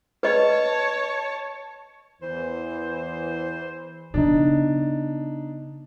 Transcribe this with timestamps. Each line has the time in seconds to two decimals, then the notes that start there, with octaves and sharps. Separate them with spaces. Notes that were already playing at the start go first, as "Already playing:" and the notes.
0.23 B4 C#5 D#5 A5
2.22 E2 E3 C5
4.14 C#3 B3 D4 D#4